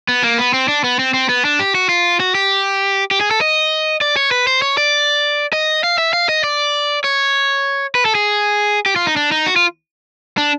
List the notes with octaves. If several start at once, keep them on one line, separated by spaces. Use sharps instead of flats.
B3
A#3
B3
C4
D4
B3
C4
C4
B3
D4
G4
F#4
F4
F#4
G4
G4
G#4
A4
D#5
D5
C#5
B4
C5
C#5
D5
D#5
F5
E5
F5
D#5
D5
C#5
B4
A4
G#4
G4
F4
D#4
D4
D#4
F#4
F4
D4